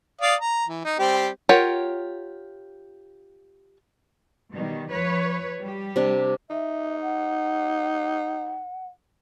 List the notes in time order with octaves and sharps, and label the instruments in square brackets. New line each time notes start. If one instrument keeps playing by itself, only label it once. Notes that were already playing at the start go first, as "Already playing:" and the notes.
[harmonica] D5 F5 D#6
A#5
E3
D#4
G3 C4 G4
[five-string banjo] F4 G4 A#4 C#5 F#5
[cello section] B2 D#3 G3
F3 B4 C#5
G3 G4
[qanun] C3 D4
[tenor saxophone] D#4 [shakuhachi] E5
[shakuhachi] F#5